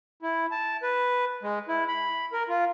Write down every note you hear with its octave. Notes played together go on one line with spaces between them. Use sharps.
E4
A5
B4
G#3
E4
B5
A#4
F4